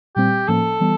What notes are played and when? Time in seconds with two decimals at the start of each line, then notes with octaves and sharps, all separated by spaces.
0.16 A#2 G3 C4 G4
0.48 A2 F3 A#3 C#4 A4
0.80 E3 G3 B3